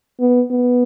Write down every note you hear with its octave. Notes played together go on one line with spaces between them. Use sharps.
B3
B3